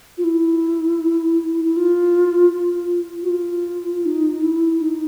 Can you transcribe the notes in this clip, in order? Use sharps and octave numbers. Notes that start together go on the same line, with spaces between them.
F4
E4
E4
F4
F4
F#4
F4
D#4
E4
D#4